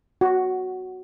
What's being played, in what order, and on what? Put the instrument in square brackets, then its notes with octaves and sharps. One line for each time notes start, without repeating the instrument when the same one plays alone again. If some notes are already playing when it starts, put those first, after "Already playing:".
[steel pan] F#4